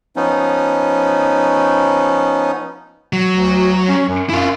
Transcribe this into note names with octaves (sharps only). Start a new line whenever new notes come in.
F3 B3 C#4 D#4
F#3
D2
C#4
F#2
F#2 E4 F4